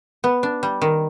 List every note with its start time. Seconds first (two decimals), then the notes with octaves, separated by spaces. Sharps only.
0.24 B3
0.43 D4
0.63 G3
0.81 D#3